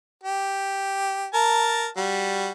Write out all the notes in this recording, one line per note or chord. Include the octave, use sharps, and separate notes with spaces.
G4
A#4 A5
G3 F#4